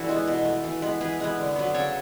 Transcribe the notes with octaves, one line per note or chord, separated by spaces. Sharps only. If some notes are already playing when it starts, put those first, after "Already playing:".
Already playing: E3 D4 E4 F#4 A4
G#3 B3
B2
A3
E3
G#3 B3
E3 G#4 B4
G#3 B3
D3
F#3 B3
C#3 A4 C#5